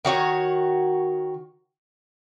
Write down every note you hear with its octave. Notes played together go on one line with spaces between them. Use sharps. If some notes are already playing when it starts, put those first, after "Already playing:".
D#3 F#4 C#5